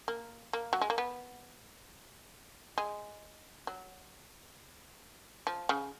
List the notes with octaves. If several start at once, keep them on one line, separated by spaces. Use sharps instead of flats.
A#3
A#3
F#3
G#3
A#3
B3
G#3
F#3
F3
C#3